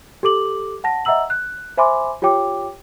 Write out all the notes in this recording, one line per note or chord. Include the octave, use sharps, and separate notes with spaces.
G4 A4 D6 F#7
F#5 A5 A#6
D#5 E5 F#5 A#5 E6 F#7
F#6
C5 E5 G#5 B5 C6 D6
F4 G4 C#5 G5 D6